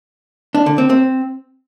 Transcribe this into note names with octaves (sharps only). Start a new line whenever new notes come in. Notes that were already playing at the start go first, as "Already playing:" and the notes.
D4
D3
C4
C4